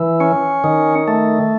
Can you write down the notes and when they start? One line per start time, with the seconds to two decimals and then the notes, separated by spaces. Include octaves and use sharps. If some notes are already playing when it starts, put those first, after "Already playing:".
Already playing: E3
0.20 C#4
0.64 D#3
1.08 A3